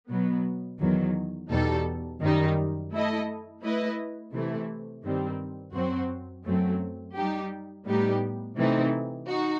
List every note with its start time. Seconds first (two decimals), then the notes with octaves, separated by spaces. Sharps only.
0.10 B2 F#3 B3
0.80 E2 D#3 F#3
1.51 E2 B2 G3 D#4 A4
2.21 F#2 D#3 G3 D#4
2.92 A3 E4 A4 D#5
3.63 A3 E4 B4 D#5
4.33 C3 E3 A3 E4
5.04 G2 D#3 G3 C4
5.74 F#2 F#3 C4 F#4 C5
6.45 F#2 F#3 A3 C4
7.16 G3 D#4 G4
7.86 A2 G3 B3 D#4 G4
8.57 C3 E3 A3 C4 D#4
9.27 D#4 F#4